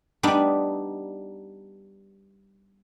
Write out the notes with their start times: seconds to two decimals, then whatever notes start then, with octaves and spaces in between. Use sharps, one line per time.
0.23 G3 B3 D4 D#4